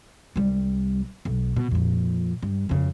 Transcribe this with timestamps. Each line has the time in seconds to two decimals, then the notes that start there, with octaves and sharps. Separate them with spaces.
0.36 C2 G3
1.25 B1
1.56 B2
1.71 F2 A#2
2.43 G2
2.69 F2 C#3